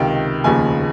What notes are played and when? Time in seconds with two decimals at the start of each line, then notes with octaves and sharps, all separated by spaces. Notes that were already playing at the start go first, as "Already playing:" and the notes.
Already playing: C#2 C3 D#3 G5
0.44 F1 D#2 C#3 F3 G#5